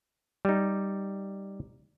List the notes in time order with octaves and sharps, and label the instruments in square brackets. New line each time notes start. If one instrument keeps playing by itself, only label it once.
[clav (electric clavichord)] G3 D#4